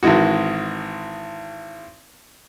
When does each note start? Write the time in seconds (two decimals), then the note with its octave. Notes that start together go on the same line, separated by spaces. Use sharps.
0.03 G#1 D#3 E3 G#3 F#4